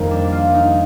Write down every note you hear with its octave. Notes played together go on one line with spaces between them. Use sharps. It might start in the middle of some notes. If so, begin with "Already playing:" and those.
Already playing: F2 D#3 G3 A#3 A#4
D4
F4
D#4